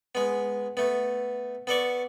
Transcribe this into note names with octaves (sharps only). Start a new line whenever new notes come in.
G#3 B3
A3 B3
B3 A4 D5 C#6